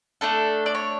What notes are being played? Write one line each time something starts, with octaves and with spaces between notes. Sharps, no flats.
A3 D4 A4
D5
C#5